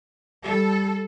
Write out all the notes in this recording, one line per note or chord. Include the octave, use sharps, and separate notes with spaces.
G3 A4